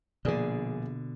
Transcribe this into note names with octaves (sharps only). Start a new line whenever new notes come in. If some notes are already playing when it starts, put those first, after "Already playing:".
A#1 B2 D3 G#4 D5